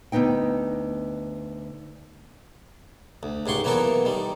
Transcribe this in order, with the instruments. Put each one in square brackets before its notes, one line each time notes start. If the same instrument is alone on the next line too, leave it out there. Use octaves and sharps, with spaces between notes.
[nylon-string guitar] D2 G#2 B3 D#4 G5
[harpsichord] D2
C#2 G#2 G4 C6 C#6
E3 F#3 A#3 B3 A4 A#4
D#3 G3